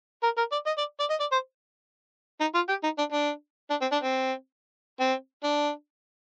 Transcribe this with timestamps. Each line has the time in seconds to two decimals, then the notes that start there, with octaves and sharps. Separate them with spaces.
0.23 A#4
0.37 A#4
0.52 D5
0.67 D#5
0.78 D5
1.00 D5
1.10 D#5
1.20 D5
1.32 C5
2.40 D#4
2.55 F4
2.69 G4
2.84 D#4
2.98 D4
3.12 D4
3.70 D4
3.81 C4
3.92 D4
4.03 C4
5.00 C4
5.44 D4